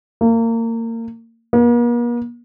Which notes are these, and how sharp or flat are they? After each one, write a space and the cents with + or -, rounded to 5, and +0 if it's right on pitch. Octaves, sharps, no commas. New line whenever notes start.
A#3 -30
A#3 +45